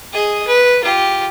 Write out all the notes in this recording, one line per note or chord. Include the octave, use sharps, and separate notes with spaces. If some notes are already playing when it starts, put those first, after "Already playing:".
G#4 D#5
B4
F4 G4